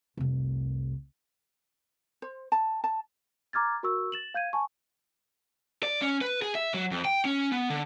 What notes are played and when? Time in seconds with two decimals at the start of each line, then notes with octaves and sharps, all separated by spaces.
0.17 F1 C2
2.22 C5
2.52 A5
2.84 A5
3.53 A#5 D6 F6 G#6 A6
3.83 F#4 A#4 C#6 E6
4.12 A6 E7 F#7
4.34 F5 G6 G#6 D#7
4.53 G#5 A5 C#6
5.83 D5
6.02 C#4
6.21 B4
6.42 G#4
6.55 E5
6.74 F#3
6.91 F2
7.05 G5
7.25 C#4
7.52 B3
7.70 D3